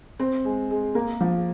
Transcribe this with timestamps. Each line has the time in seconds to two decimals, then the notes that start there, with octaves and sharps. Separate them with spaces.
0.19 C4
0.45 G#3
0.70 G#3
0.95 A#3
1.20 F3